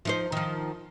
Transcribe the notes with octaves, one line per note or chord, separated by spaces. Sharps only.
F3 D#4 C5
D#3 F3